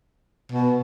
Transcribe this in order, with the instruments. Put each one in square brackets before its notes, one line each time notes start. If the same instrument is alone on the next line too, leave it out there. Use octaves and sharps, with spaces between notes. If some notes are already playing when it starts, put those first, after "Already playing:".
[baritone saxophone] B2